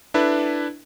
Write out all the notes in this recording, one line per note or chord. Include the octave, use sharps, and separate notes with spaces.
D4 E4 A4 B4